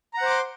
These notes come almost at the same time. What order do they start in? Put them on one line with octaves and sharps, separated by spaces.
A#5 F#5 C5 D6 C6